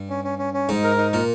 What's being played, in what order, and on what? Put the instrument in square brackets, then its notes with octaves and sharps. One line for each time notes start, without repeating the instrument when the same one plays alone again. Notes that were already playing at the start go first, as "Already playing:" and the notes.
Already playing: [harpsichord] G2
[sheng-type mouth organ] C#4
C#4
C#4
C#4
[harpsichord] G#2 [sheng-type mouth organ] D#4
[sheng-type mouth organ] A#4
D#4
[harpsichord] A#2 [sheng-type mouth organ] A#4